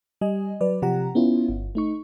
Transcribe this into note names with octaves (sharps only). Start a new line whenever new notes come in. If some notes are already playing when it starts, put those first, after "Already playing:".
G3 D#5 G#5
F#3 B4 D5
C3 F3 G4 F#5 A#5
B3 C#4 E4 F4
G1
A3 D#4 C#6